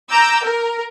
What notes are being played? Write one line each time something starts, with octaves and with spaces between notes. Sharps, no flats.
A#5 D6 E6 G6
A#4